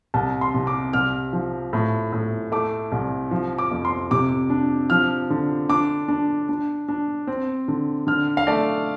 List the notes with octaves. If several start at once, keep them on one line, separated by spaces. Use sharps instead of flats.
C2 A5
C6
C3
D6
C2 F6
F3
A2
A2
A3 D6
C2
F3
D6
F2
C6
C3 D6
D4
F3 F6
D3
D4 D6
D4
D4
D4
C4
D3
D3 F6
F5
A3 D5